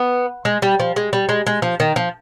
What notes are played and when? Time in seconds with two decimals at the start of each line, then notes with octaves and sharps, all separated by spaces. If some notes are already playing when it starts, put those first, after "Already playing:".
Already playing: B3
0.45 G#3
0.62 G3
0.79 F3
0.96 G#3
1.13 G3
1.29 G#3
1.46 G#3
1.62 F3
1.80 D#3
1.96 F3